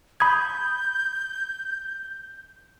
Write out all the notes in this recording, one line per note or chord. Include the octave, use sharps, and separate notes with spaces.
B5 D#6 G6 G#6